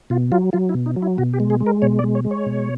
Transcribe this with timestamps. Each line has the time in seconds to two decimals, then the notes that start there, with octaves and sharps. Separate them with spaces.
0.10 B2 F4
0.32 F#3 F4
0.53 F#3 F4
0.69 E4
0.74 B2
0.86 D#4
0.96 F#3
1.02 E4
1.18 B2 F#4
1.33 G4
1.40 G#3
1.50 G#4
1.60 G#3
1.66 A#4
1.82 B2 C#5
1.99 D5
2.04 G#3
2.15 C#5
2.25 G#3
2.31 C#5
2.46 B2